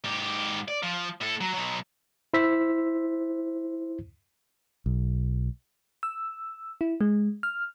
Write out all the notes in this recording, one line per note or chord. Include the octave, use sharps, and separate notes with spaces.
G#2 G4
D5
F3
A2 A4
F#3
B2 F#3
E4 C5 E6 B6
B1
E6
E4
G#3
F6